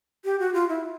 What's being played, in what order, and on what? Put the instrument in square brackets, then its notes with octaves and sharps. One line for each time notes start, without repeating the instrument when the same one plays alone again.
[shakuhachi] G4
F#4
F4
E4